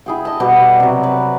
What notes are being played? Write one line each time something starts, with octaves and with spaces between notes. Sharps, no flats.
E4 G#4 G5
D#5 A5
B2 G3 G4 B4
D5
C3 F#3
B4